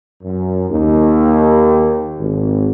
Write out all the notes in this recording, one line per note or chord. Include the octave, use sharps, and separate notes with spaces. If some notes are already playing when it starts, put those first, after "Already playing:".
F#2
D#2
G#1